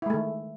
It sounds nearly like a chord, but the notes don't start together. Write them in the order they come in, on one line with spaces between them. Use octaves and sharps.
E4 G#3 A3 D#3